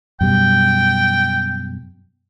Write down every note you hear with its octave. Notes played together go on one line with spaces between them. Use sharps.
F#2 B2 G3 G5